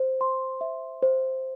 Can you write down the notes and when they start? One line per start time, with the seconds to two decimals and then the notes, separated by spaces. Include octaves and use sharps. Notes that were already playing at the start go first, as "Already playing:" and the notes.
Already playing: C5
0.21 C6
0.61 E5
1.02 C5